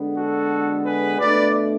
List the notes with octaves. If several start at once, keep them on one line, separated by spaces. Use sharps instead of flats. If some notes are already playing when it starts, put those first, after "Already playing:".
Already playing: D3 G#3 B3 D4
F#4 A4
G#4 B4
B2 A3 D4 B4 D5